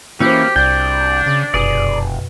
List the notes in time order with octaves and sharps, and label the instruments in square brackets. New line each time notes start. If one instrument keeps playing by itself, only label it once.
[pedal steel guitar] E3 C#4 E4 [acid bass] A#3 [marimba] F#4 C5 [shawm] G4
[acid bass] C2 [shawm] D4 [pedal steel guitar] G5
[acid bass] C#3
[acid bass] F1 [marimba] F#2 B2 [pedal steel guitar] G#4 D5